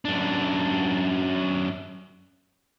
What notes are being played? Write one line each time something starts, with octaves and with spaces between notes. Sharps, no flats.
F#2 D4